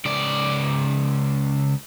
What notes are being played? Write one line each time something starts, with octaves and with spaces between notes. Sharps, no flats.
C#2 D5